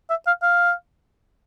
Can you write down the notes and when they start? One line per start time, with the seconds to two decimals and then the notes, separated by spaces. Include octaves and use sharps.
0.09 E5
0.27 F5
0.42 F5